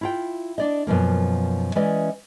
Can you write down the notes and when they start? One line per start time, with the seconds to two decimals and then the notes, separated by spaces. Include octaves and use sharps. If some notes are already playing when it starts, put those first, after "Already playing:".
0.01 E4 F4 G5
0.58 D4 D5 D#5
0.87 F#2 B2 F3 A#3
1.75 E3 G#3 C#4 E4 D5 D#5